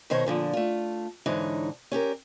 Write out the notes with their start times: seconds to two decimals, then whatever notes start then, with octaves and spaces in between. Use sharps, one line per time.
0.10 B2 D#3 C5 C#5
0.26 A#2 D3 F3
0.53 A3 F4
1.26 G#2 D3 E3 D#4 C#5
1.92 C#4 G4 G#4 A#4